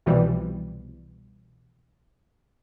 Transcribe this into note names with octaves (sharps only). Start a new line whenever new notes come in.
C2 B2 E3 F3 G3